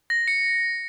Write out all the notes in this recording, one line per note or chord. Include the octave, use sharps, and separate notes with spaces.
A#6
C#7